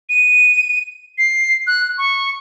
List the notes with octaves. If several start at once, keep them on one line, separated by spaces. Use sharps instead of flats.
D#7
C7
F#6
C#6